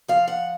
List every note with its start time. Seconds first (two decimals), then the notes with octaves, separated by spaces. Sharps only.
0.08 F3 F5
0.28 F#5